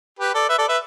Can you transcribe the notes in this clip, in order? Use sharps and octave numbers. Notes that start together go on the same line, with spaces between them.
G4 B4
A4 D5
B4 E5
A4 D5
B4 E5